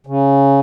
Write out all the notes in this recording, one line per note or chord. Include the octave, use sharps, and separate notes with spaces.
C#3